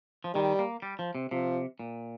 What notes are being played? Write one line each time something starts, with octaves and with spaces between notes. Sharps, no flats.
F3
D#3 G3
A#3
G3
F3
C3
C3 F3
A#2